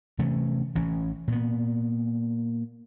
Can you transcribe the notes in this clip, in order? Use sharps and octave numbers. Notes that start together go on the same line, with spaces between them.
C3 E3 A3 C#4
A1 E3 C#4
A#2 B3